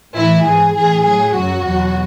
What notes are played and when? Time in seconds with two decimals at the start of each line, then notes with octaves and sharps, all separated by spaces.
0.16 A2 E3 E4
0.46 G#2 E3 G#4
0.76 A2 E3 G#4
1.06 A2 F#3 G#4
1.36 F#2 C#3 F#3 F#4
1.66 E2 B2 F#3